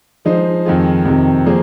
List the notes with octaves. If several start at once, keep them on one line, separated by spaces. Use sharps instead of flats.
F3 G#3 D#4 C5
F2 D#3 G#3 F4 G#4
F2 C3 D#3
F3 A#3 G#4 C5